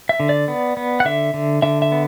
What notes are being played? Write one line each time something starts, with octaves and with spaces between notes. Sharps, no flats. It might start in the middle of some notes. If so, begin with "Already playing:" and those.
E5
D3
D5
B3
B3
F#5
D3 E5
D3
D3 E5
E5
B3